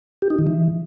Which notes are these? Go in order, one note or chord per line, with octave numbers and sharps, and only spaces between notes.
G4
D#4
D#3
E3